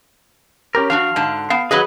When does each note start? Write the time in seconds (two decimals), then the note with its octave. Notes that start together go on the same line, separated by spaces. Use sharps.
0.75 C#4 G4 A#4
0.90 F3 D4 F#4 F5
1.16 G#2 D3 A5
1.50 B3 F5
1.71 F#3 G#4 B4 D#5 B5